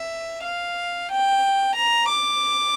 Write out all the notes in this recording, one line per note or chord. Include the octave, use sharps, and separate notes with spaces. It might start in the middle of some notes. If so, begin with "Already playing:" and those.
Already playing: E5
F5
G5
A#5
D6